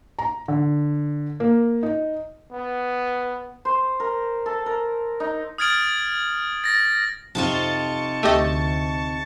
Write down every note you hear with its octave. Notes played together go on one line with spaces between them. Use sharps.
A#5
D3
A#3
D#4
B3
C5
A#4
A4
A#4
D#4
D#6 F6 G#6 A6 D7 F#7
A6 A#6
F2 C3 D#4 F4 A5 C#6
D2 A3 G4 D#5